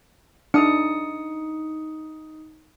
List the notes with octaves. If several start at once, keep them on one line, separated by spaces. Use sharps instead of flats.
D4 D#4 D#6 C#7